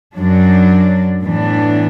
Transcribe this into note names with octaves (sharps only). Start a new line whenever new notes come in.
F#2 F#3 D4
A2 E3 B3 D4